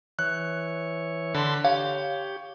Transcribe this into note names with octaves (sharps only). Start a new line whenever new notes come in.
E3 C#5 F#6
D3 A5 B5 C6
G4 C#5 F5